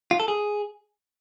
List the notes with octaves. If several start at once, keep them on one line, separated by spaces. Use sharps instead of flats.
F4
A4
G#4